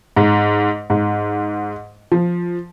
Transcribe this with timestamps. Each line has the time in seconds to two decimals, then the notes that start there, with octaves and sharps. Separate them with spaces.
0.17 G#2
0.90 G#2
2.12 F3